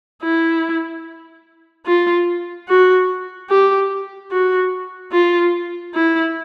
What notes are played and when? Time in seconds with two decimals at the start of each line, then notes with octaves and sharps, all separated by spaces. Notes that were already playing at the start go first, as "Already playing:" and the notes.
0.23 E4
1.86 F4
2.68 F#4
3.50 G4
4.31 F#4
5.12 F4
5.94 E4